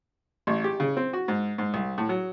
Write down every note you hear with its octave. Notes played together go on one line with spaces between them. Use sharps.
A1
G4
C#3
C4
F#4
G#2
G#2
C2
A2
F#3